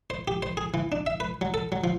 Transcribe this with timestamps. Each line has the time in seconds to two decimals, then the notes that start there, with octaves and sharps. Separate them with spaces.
0.10 C5
0.28 G4
0.42 C5
0.57 G#4
0.74 E3
0.92 D4
1.06 E5
1.20 B4
1.41 F#3
1.54 A4
1.72 F#3
1.84 F3